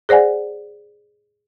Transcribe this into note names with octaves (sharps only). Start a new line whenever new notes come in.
G#4 C5 D5 F#5 G#5